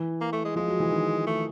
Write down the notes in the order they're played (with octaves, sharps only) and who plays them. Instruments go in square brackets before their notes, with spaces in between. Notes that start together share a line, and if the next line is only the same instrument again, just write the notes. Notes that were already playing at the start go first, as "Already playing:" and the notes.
Already playing: [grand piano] E3
[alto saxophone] A#3
A3
G#3
[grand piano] F3 [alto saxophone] G#3
[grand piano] F#3
E3
D#3
[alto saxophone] A3